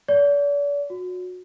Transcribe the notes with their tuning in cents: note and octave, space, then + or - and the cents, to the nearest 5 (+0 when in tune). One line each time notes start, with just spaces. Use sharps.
D5 -40
F#4 -30